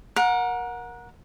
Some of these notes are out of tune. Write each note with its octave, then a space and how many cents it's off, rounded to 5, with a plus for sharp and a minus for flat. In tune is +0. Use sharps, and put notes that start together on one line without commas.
A#4 +20 F#5 -20